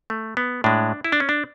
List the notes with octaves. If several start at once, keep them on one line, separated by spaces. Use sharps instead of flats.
A3
B3
A2 G#3 D4
E4
D4
C#4
D4